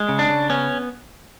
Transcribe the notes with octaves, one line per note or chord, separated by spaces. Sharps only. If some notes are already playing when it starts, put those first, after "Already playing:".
Already playing: G#3
C#3
D4
C#3
B3 C#4